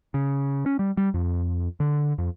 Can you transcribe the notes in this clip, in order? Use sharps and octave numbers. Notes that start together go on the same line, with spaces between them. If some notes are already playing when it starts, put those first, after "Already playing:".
C#3
C#4
G3
G3
F2
D3
F2